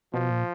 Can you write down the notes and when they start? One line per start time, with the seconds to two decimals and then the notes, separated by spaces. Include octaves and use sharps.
0.13 B2 F3
0.31 A#2